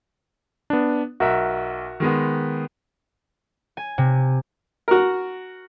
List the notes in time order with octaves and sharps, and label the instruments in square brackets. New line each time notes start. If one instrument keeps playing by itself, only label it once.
[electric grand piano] B3 D4
[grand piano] B1 [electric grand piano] F#4 A#4 E5
[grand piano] D#3 G#3 B3
[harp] G#5
C3
[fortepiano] F#4 A#4